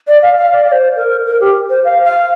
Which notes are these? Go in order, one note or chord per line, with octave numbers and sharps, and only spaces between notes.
D5
F5
F5
D5
D5
C5
A#4
A#4
G4
C5
F5
F5